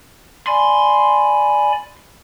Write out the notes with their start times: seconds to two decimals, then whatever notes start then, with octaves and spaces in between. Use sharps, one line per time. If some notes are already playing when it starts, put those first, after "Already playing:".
0.47 D5 G#5 B5 C6